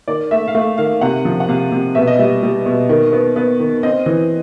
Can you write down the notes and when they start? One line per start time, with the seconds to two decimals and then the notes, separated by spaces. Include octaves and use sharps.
0.08 D#3 D5
0.31 A3 E5
0.48 F5
0.55 A3 E5
0.78 D#3 F5
1.01 C3 F#5
1.25 F3
1.40 F#5
1.49 C3 F5
1.72 C3
1.95 B2 E5
2.07 D#5
2.19 G3 E5
2.43 G3
2.66 B2
2.89 D#3
3.12 B3
3.36 B3
3.60 D#3
3.83 C4 D#5
4.06 E3